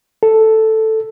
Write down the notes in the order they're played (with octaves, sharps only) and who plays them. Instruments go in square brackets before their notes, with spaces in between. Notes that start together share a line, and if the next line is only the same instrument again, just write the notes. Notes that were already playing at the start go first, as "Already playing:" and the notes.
[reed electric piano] A4